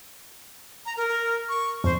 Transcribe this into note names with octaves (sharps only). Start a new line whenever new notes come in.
A#5
A#4
C#6
F2 C5